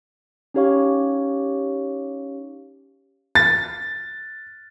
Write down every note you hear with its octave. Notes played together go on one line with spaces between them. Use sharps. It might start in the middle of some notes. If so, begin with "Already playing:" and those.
C#4 D#4 G4 C#5 F5 C#6
A6